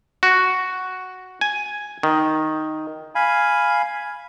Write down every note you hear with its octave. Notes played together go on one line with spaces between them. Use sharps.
F#4
G#5
D#3
F5 G#5 B5